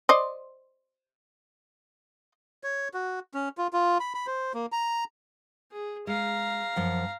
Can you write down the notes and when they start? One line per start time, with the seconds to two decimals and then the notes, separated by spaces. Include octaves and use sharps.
0.09 C5 D5 D#5
2.64 C#5
2.94 F#4
3.34 C#4
3.58 F4
3.73 F4
4.00 B5
4.15 B5
4.27 C5
4.54 A#3
4.72 A#5
5.72 G#4
6.07 G#3 F5 A#5
6.76 F#2 F3 F#5